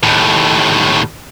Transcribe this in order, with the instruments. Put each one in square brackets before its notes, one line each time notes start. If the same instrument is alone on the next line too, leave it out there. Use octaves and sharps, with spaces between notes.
[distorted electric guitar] D#2 A2